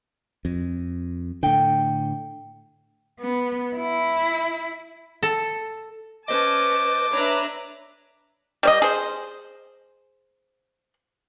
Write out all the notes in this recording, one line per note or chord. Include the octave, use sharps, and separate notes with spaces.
F2
A2 D3 G5
B3
E4
A4
C#4 B4 C5 D#5 A5 D6
D4 B4 C#5 D5 E5 A#5
G3 C#5 D#5
G#4 C5